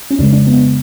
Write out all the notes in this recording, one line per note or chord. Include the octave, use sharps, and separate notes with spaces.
C#4
F2 C#3 G#3 D4
D4
B3